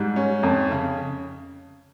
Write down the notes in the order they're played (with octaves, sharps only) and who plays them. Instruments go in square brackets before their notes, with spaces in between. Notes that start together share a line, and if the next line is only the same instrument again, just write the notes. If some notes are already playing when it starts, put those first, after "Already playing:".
Already playing: [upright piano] G#2 G3
C#4
F2
C#3